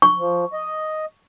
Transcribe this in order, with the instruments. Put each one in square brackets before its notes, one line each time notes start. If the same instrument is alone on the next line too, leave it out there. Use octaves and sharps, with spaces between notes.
[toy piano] C#6
[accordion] F3
D#5